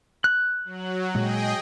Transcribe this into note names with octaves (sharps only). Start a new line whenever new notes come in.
F#6
F#3
A#2 G#3 G#4 D#5 G5